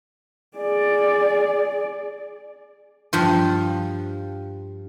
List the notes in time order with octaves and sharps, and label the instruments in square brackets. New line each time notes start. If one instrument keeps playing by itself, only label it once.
[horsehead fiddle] G#4 D5
[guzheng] G2 F3 F4